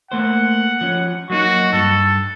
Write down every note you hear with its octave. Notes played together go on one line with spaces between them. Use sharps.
A3 A#3 C5 F#5
F3 C#4
F#3 A#3 D#4 F#4
G2 A4